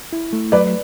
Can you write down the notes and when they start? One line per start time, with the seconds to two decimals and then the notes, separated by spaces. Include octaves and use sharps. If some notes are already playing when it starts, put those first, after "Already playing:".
0.13 E4
0.33 A3
0.52 F#3 B4 D5